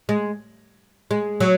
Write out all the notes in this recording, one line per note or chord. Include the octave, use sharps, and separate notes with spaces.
G#3
G#3
F#3